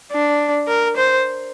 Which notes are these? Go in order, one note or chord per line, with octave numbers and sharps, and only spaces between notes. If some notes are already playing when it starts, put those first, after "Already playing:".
D4
A#4
C5